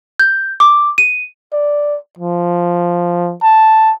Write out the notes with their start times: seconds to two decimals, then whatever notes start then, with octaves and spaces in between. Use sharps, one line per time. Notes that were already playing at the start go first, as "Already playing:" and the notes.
0.19 G6
0.60 D6
0.98 D#7
1.53 D5
2.19 F3
3.43 A5